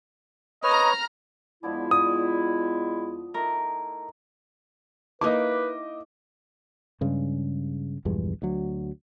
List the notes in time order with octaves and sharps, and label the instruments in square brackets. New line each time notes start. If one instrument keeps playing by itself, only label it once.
[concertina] B4 C#5 [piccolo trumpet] D#5 [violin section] A#5 F6
[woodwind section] E2 G#3 E4 [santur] F3 B3 D4
[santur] F4 F5 [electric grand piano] D#6
[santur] A3 D#4 E4 [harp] A#4
[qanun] A#3 D#4 E4 [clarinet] B4 [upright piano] D#5 D6
[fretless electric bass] G2 C#3 G#3
A#1 E2 G2 G#3
D2 F#3